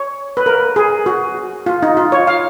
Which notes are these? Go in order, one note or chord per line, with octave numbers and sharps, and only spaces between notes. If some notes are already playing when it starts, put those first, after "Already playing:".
Already playing: C#5
B4
A#4
G#4
F#4
F4
D#4
F4
C#5
F5